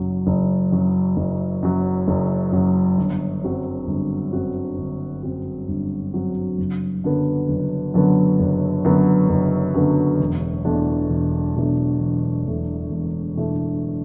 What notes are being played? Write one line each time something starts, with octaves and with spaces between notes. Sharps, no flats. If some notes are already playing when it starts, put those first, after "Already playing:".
Already playing: F#1 F#2 F#3
F#1
F#2 F#3
F#1
F#2 F#3
F#1
F#2 F#3
G1
F#2 F#3 C4 F#4
G1
F#2 F#3 C4 F#4
G1
F#2 F#3 C4 F#4
G1
F#2 F#3 C4 F#4
F#1
F#2 D3 F#3 B3
F#1
F#2 D3 F#3 B3
F#1
F#2 D3 F#3 B3
F#1
F#2 D3 F#3 B3
E1
E2 B2 A3 D4
E1
E2 B2 A3 D4
E1
E2 B2 A3 D4
E1
E2 B2 A3 D4